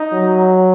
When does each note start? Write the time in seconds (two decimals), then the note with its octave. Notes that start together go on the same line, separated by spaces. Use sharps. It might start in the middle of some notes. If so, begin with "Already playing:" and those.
Already playing: D#4
0.13 F#3